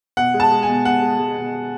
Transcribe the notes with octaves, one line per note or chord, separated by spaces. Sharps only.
B2 F#5
G#3
A5
G#3
G#5
B2
B2 F#5
G#3
G#3
B2